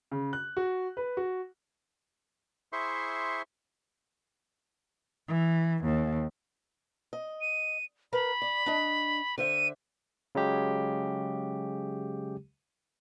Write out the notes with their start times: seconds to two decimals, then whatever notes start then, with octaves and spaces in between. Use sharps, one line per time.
0.12 C#3
0.33 F#6
0.57 F#4
0.97 B4
1.17 F#4
2.73 E4 G#4 C5 E5 C6 C#6
5.28 E3
5.85 D#2
7.13 D#5
7.41 D#7
8.13 A#4 B4 A#5 B5
8.42 D5
8.66 D4 D#5
9.38 D3 C5 E5 D#7
10.35 C#3 F#3 G#3 G4